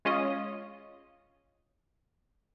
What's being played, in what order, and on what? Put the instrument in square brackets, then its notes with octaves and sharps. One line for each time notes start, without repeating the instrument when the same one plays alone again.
[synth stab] G#3 C#4 F4 D#5